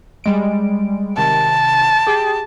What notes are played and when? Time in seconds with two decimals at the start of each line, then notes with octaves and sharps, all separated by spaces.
0.24 G3 G#3 D7
1.18 C3 D#3 A5
2.07 G4 G#4 G5